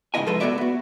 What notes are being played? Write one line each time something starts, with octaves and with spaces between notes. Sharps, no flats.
G#2 C#3 C#4 E4 D#5 G#5
F3 F#3 G#3 A3 A4 B4
A3 B3 F#4 C#5 D5 E5
B3 F#4